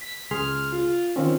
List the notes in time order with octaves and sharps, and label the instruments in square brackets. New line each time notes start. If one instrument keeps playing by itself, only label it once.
[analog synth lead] B6
[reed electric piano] C#2 G#4 C6 [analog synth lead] F6
[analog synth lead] F4
[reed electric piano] D#3 C4 C#4 [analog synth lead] F3